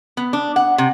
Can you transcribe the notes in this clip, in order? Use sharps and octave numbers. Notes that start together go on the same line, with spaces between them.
B3
D4
F#5
C3